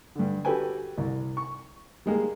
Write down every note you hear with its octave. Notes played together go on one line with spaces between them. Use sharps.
G2 D3
F#4 G4 A4 B4 G5 G#5
C2
C#6
G3 G#3 A#3